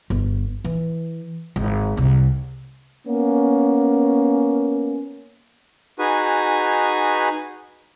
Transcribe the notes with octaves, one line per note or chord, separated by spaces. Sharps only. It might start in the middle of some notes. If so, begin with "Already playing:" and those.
G1
E3
G#1
C2
A#3 B3 C#4
D#4 F#4 G#4 B4 G#5